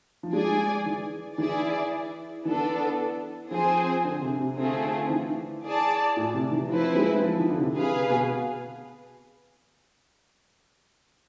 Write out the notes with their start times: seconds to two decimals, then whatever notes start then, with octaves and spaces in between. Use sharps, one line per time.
0.23 F3
0.33 G#3 G#4 D5 G#5
0.86 E3
1.38 E3 E4 G#4 D5
2.45 E3 B3 D4 A4
3.51 F3 C4 G#4 C5 G#5
4.04 D3
4.21 C3
4.39 C3
4.56 D3 A3 C4 F4 G#4
4.84 D3
5.10 E3
5.63 G#4 D5 A5
6.16 A2
6.34 C3
6.51 E3
6.69 F3 C4 E4 B4
6.95 G#3
7.22 F3
7.39 E3
7.50 D3
7.57 C3
7.74 C3 G#4 B4 F5
8.10 B2